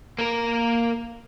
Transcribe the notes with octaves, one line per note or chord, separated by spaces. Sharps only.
A#3 A#4